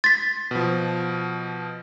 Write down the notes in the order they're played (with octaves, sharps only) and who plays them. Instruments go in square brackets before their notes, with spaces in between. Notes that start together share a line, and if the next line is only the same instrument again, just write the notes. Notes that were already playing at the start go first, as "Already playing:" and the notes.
[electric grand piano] C6 [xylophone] A6 B6
[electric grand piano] B2 F3